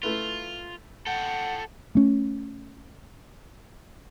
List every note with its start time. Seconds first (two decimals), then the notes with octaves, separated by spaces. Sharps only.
0.03 A3 E4 F4 B4
1.07 A4 F#5 G5
1.95 A3 C#4